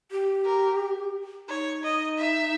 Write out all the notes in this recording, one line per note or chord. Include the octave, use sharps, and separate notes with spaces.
G4
A#4
D#4 C#5
D#5
E5